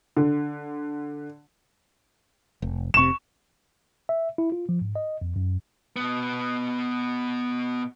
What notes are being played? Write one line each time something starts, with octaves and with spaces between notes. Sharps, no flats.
D3
F1
F1 C3 C#6 E7
E5
E4
F4
F3
G#2
D#5
F2
F#2
B2 B3